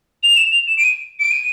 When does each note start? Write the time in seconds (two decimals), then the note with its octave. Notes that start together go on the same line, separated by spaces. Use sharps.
0.23 F7
0.36 E7
0.52 F7
0.67 E7
0.77 D7
0.84 D#7
1.20 D7
1.31 D#7